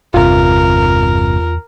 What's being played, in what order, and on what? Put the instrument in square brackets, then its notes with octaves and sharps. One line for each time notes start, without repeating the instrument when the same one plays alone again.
[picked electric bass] G1 G2 C3 [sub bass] E2 [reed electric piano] F4 [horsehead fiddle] A#4